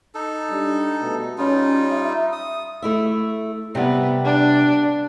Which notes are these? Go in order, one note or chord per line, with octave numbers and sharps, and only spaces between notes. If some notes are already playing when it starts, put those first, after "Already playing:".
D#4 A4
G3 D4
B2 A3
G3 C#4 D#4 F4
E5
D#6
A3 E4 E5
C3 G3 B3
D4